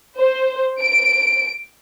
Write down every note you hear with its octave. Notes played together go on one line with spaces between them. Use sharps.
C5
D7